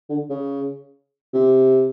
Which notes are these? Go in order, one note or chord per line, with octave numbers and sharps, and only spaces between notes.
D3
C#3
C3